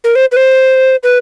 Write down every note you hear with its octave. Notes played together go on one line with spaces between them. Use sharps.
A#4
C5
B4
C5
B4